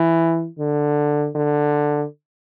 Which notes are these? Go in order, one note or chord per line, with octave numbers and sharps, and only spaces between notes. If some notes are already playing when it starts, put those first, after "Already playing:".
Already playing: E3
D3
D3